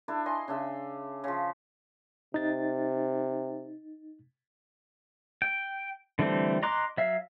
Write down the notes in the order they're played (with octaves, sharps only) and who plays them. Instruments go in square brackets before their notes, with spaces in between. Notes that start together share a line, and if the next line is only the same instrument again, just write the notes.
[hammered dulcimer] D4 E4 A4
D#5 G#5 C6
C#3 D4 E5 C6
C#3 F3
[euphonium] C3 [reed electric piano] D#4 A6
[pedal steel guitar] G5
D3 E3 G3 A3 C4
D#5 A#5 C6 D6 F#6
F#3 E5 F5